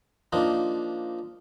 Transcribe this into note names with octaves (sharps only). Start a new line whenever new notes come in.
F3 A#3 D4 D#4